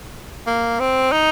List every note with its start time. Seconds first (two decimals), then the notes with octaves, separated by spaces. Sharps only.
0.47 A#3
0.79 C4
1.12 D#4